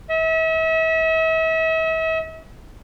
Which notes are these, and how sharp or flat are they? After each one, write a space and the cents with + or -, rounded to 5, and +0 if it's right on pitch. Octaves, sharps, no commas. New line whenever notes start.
E5 -40